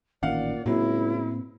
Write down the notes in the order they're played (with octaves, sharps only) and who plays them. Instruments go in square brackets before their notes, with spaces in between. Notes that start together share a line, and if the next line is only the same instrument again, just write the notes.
[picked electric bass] A1 D#3 C#4 [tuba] A#2 [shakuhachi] D5 [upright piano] F5 F#5
[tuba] C#2 [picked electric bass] A2 A#3 C4 [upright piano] F#3 [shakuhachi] E4